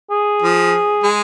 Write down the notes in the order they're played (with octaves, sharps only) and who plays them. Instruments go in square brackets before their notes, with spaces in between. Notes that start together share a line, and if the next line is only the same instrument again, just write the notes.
[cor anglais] G#4
[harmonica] F3
G#3